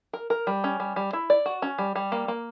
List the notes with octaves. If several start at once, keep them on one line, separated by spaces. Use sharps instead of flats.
A#4
A#4
G3
C#4
G3
G3
E4
D5
F#4
C#4
G3
G3
A#3
A#3